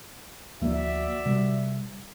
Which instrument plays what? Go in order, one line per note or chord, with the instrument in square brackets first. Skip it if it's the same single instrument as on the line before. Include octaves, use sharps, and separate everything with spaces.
[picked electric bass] D2 F3 A#3 [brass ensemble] F#4 D5 E5
[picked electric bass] C3 G3